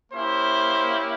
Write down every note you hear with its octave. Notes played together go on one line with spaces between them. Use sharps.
A#3 C#4 E4 G4 C5